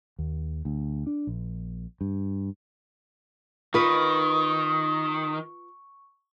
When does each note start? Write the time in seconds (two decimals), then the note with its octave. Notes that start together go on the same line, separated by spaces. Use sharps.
0.19 D#2
0.65 D2
1.07 D4
1.27 A#1
2.01 G2
3.74 D#3 F4 B4 C#6 D#6